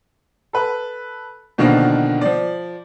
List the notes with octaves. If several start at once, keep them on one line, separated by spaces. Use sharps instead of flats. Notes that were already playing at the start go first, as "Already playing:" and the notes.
A4 B4
B2 D3 D#3 F3 A#3 B3
F3 D5